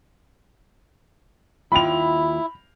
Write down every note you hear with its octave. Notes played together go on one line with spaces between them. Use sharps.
D#2 E4 F4 G5 B5 F7